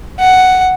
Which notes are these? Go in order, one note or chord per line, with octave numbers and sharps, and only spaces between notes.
F#5